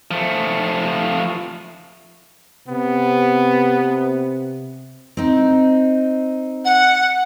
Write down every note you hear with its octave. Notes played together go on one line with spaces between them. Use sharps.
F3 A3
C3 B3
C4 D#4
F#5